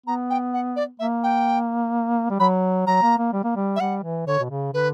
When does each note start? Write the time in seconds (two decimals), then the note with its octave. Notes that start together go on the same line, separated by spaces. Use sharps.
0.06 B3 A#5
0.30 G5
0.54 F#5
0.76 D5
0.99 A#3 E5
1.24 G5
2.31 G3
2.40 F#3 B5
2.87 F#3 A#5
3.03 A#3
3.18 A#3
3.33 G3
3.44 A#3
3.56 G3
3.76 E5
3.80 G3 F#5
4.03 E3
4.27 D3 C#5
4.40 B2
4.50 C#3
4.73 D3 B4